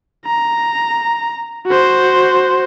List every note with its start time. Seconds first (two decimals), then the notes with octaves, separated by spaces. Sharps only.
0.26 A#5
1.67 F#4 C5